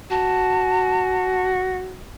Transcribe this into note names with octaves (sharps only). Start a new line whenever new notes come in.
F#4 A5